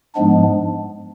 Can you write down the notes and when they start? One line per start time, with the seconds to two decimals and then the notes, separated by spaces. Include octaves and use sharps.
0.16 G#2 F3 G#3 B3 D4